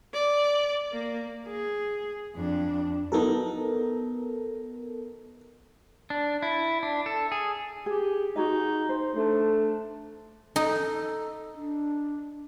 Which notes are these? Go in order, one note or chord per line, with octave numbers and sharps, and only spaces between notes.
D5
A#3
G#4
F2 D4
F#3 B3 D#4 A4 A#4
D4
E4
D4
A4
G#4
G4 G#4
D#4 F#4 G#4 D#5
C5
A3 D4 C5
D#4 A4
D4